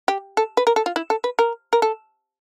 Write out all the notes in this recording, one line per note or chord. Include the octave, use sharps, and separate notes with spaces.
G4
A4
B4
A#4
A4
F4
E4
A4
B4
A#4
A#4
A4